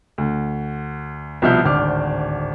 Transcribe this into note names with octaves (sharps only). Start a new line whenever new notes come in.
D2
C2 B2 F3 E5 F6 G6
D1 G#1 D4 D6 F6